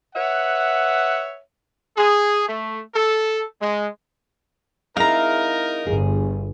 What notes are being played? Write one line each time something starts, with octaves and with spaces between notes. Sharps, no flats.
B4 C#5 E5 F#5
G#4
A3
A4
G#3
G#3 C4 D#4 E4 A#4 F5 A#5
G1 G#4